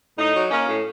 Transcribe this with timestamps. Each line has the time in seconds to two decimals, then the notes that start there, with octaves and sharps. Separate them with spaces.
0.19 A2 D#4
0.35 F#3
0.51 A#3 C#4
0.68 A2